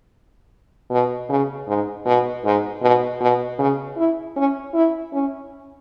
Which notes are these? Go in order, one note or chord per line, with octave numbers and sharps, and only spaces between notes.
B2
C#3
G#2
B2
G#2
B2
B2
C#3
E4
C#4
E4
C#4